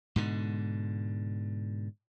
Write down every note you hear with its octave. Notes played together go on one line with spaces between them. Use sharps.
G#2 B2 D3